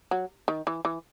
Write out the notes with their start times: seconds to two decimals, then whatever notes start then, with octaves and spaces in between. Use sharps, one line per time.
0.11 F#3
0.48 D#3
0.67 E3
0.85 E3